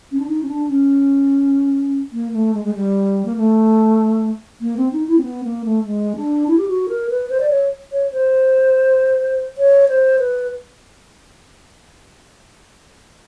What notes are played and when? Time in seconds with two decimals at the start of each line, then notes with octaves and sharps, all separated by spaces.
0.12 C#4
0.19 D4
0.27 D#4
0.43 C#4
0.48 D4
0.68 C#4
2.13 A#3
2.33 A3
2.54 G#3
2.65 G#3
2.75 G3
3.26 A#3
3.37 A3
4.61 A#3
4.77 C4
4.93 D#4
5.08 E4
5.18 C4
5.23 B3
5.44 A#3
5.65 A3
5.85 G#3
6.17 D4
6.48 E4
6.58 G4
6.68 F#4
6.89 A#4
7.10 B4
7.30 C5
7.40 D5
7.50 C#5
7.92 C#5
8.12 C5
9.58 C#5
9.89 C5
10.19 B4